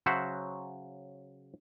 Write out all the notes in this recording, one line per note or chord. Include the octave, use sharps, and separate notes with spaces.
C#3 F#3 C5 E5 F#5